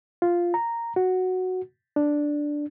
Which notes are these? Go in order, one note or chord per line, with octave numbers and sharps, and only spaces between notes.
F4
A#5
F#4
D4